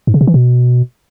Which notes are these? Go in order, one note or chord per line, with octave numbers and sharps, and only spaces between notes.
G#2
C#3
C3
E3
B2